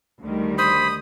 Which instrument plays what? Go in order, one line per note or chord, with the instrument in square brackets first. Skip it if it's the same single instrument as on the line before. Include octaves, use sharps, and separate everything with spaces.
[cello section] D2 D#3 G3
[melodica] C5 B5 [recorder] D#6